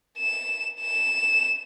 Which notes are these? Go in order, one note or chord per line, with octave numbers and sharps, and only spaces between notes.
E7
E7